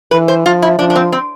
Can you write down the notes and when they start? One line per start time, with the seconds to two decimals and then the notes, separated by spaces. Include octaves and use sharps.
0.11 E3 B4
0.28 C5
0.45 F3 F4
0.62 E4
0.79 F3 D4
0.90 D4
0.96 C4
1.12 C4